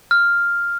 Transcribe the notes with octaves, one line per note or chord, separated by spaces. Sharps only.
F6